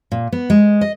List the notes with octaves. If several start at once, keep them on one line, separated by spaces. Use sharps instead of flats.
A#2
B3
G#3
D#5